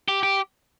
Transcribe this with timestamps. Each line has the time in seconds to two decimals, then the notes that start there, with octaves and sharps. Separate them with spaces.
0.08 G4
0.23 G4